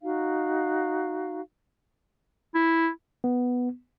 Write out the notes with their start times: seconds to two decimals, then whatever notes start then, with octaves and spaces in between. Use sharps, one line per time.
0.03 D#4 F#4 F5
2.55 E4
3.24 B3